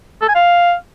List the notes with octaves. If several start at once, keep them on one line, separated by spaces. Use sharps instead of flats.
A4
G#5
F5